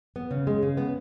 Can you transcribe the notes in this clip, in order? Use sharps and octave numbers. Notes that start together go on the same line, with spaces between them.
B3
C#3
G#3
C#3
B3